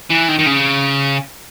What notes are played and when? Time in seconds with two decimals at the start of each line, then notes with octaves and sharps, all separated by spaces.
0.10 E3
0.28 D#3
0.39 D#3
0.46 C#3